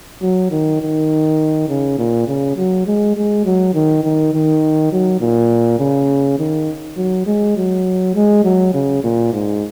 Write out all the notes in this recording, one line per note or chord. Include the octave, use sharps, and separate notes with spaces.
F#3
D#3
D#3
C#3
A#2
C#3
F#3
G#3
G#3
F#3
D#3
D#3
D#3
F#3
A#2
C#3
D#3
F#3
G#3
F#3
G#3
F#3
C#3
A#2
G#2